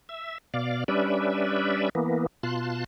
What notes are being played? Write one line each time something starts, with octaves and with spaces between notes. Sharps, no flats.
E5
B2 D5 F5
G3 C#4 D4 B4 D5 E5
E3 A#3 B3
B2 F4 A5 C6 F#6